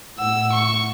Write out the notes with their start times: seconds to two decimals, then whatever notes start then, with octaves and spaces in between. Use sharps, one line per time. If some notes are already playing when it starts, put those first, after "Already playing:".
0.19 A2 F#5 E6
0.52 C#6